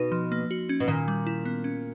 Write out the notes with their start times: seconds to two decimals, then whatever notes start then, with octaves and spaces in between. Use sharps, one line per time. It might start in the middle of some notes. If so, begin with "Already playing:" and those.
Already playing: B2 D#4
0.12 F3
0.32 A#3
0.51 F#4
0.69 C#4
0.80 B2
0.88 A#2 D#3
1.08 G3
1.27 E4
1.45 B3
1.64 C#4